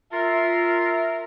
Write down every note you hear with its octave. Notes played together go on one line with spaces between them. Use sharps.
F4 A#4 E5